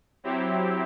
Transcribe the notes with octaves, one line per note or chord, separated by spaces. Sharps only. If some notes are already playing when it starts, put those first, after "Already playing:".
F#3 C4 E4 G4